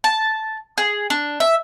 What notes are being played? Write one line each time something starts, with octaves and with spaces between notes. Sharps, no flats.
A5
G#4
D4
E5